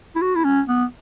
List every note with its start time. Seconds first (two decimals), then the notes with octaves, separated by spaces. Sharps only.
0.16 E4
0.22 F#4
0.36 E4
0.45 C#4
0.68 B3